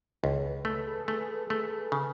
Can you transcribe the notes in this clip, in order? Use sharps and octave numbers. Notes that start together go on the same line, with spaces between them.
C#2 G#4
B4
A3 A4
A4
G#4
A3
A3
C#3